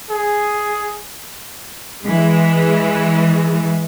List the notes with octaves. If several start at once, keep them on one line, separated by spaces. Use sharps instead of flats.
G#4
E3 G#3